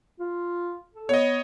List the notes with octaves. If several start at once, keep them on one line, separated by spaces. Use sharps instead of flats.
F4
A4
B3 C#5 D#5